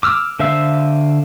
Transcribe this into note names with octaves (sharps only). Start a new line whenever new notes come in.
D6 E6 F6
D3 C5 E5 F5 E6